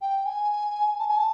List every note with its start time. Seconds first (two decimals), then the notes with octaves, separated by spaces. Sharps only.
0.01 G5
0.26 G#5
0.99 A5
1.08 G#5
1.17 A5